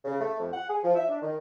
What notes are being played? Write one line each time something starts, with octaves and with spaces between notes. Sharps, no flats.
C#3
A3
F2
F#5
G#4
F3
E5
D4
D#3